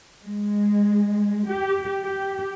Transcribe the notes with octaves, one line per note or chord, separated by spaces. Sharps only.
G#3
G4
G4